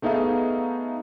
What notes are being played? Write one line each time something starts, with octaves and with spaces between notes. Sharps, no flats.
A3 B3 D#4 G#4 E5 F5